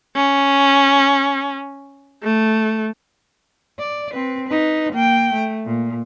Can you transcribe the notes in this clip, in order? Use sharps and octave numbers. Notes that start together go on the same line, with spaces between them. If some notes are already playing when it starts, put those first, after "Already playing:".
C#4
A3
D5
C4 B4
D#4 B4
A#3 G5
A3
A#2